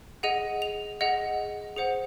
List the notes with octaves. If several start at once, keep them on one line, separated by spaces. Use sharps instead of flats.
G#4 D#5 F#5 D#7
F7
G#4 D#5 F#5
G#4 C5 F#5 C#7